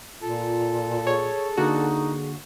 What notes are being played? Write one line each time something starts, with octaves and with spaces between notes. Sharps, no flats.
A#2 F4 A4
G#4 C#5
D3 A#3 D#4 F#4